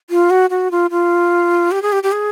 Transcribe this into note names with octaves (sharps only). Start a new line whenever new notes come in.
F4
F#4
F#4
F4
F4
G4
G#4
G4
G4
G#4